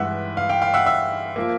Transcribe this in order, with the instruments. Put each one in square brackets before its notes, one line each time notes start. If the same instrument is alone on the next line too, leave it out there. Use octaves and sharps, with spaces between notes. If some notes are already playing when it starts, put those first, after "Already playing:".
Already playing: [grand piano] G2 E3 G#3 E5 F#5
F5
F5 G5
F5 G5
E5 F#5
E5
F3 A#3